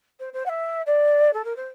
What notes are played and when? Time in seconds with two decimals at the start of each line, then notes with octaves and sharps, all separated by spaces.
0.19 C5
0.33 C5
0.46 F#5
0.49 E5
0.86 D5
1.33 A4
1.44 A#4
1.56 C5